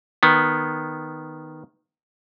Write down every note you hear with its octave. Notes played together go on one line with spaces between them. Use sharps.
D#3 B3